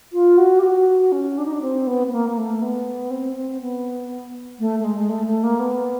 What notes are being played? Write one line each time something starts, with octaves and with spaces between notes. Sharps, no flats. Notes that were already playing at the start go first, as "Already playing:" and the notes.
F4
F#4
G4
F#4
C#4
D4
D#4
D4
C4
B3
B3
A#3
A#3
A3
B3
C4
C4
B3
A3
A3
G#3
G#3
A3
A3
A#3
B3